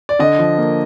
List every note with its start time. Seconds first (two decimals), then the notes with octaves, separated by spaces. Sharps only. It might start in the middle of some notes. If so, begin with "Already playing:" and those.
0.09 D5
0.19 D3 D#5
0.39 F3
0.58 A#3